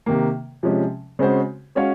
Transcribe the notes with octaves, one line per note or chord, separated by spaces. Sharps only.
C3 D#3 A#3
C3 F3 G#3 C#4
C#3 G#3 C4 F#4 C5
G#3 C#4 F#4 C#5 F5